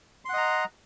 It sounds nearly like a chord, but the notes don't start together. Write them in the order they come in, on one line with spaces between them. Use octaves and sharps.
C6 F#5 D#5 A#5